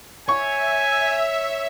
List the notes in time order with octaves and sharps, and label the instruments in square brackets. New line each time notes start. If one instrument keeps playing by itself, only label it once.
[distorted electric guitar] C#5 [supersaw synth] E5 [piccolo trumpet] G#5 [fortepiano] C#6